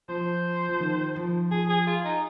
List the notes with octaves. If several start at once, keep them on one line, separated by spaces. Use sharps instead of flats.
F3 C5
F3
D#3
F3
F3 G#4
G#4
F4
D#4